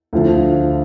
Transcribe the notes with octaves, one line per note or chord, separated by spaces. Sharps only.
D2 D3 F3